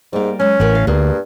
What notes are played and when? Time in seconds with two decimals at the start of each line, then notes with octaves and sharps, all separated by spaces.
0.13 G#2 G3 A#3
0.40 F#3 G#3 C#4
0.60 A1 A2 A#4 B4 F#5
0.75 F5
0.87 D2 G2 A#3 G#4